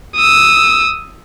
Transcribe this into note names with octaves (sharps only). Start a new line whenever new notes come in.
D#6 E6